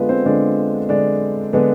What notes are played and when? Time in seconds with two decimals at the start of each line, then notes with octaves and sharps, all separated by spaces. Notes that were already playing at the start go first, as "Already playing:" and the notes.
Already playing: D3 G#3 B3 D4 F4 B4
0.09 C4 C5
0.25 D3 G#3 D4 D5
0.89 D3 G#3 D4 D5
1.53 D3 G#3 B3 D4 B4